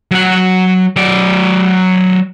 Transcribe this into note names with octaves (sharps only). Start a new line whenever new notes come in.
F#3 F#5
F#3 D5